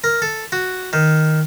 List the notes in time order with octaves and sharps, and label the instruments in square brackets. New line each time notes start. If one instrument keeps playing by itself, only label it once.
[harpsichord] A#4
A4
F#4
D#3